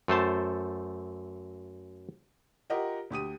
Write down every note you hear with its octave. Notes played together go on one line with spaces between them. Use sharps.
F#2 A3 C5 A5
F4 G4 A#4 D#5 F#5
D2 G4 D#6 D#7